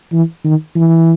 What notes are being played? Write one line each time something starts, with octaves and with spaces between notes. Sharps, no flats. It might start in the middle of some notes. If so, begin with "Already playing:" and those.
E3
D#3
E3